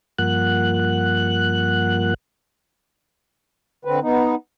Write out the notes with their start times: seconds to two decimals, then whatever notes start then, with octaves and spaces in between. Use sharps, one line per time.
0.19 G2 F3 A#3 F#5 F#6
3.85 D3 C4 B4
4.02 B3 D#4